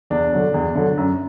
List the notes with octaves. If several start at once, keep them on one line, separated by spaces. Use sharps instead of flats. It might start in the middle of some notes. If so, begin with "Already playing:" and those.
E2 D4
D3 F#3
E2
D3 F#3
F#2